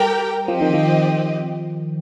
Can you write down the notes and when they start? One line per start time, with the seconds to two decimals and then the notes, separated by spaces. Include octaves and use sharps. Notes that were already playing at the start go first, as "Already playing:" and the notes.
Already playing: G3 G4 A#4 G5
0.48 F3 C4 G4 D#5
0.61 D#3
0.74 F3